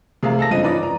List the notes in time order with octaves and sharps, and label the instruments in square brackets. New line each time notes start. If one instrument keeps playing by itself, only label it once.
[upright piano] C3 A3 G#4 A#4 F5
A4 A5 A#6
G2 C#3 F3 C4 D#5 D#7
E3 F3 C#4 D#4 B4 D5
A#5